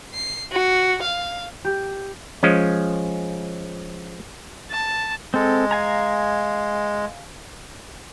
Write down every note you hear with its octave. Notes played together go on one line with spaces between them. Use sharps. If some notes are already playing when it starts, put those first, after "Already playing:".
C7
F#4
F5
G4
F3 G#3 C#4
A5
G#3 C4 A4
F5 G#5 A#5